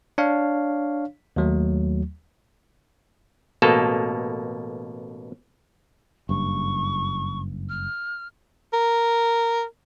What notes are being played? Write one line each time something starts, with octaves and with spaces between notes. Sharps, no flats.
D4 C#5 F5
D#2 F#3 A3
A1 B2 A#3 A4
F#1 G2 C#6
F6
A#4